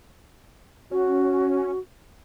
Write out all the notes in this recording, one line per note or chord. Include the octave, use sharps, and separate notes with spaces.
C#4 F#4